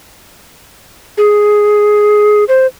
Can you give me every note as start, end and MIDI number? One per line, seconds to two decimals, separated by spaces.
1.18 2.44 68
2.48 2.67 72